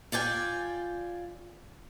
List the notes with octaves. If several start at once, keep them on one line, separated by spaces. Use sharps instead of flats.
F4 D5 G5 G#5